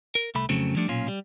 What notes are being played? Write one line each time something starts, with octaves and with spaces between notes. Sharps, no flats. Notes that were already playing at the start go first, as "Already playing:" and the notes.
A#4
C2 A3 B5
F2 C#3 F#3 A3 C4
F3 G3 A3 D4
B1 A#2 C#4 F4
G3